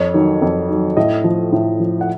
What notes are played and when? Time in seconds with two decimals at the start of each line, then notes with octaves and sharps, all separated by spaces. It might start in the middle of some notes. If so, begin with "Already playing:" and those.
Already playing: F2 C#5
0.14 D#3 F#3
0.42 F2
0.69 D#3 F#3
0.97 A2 D#5
1.24 F3
1.53 A2
1.80 F3
2.01 F#5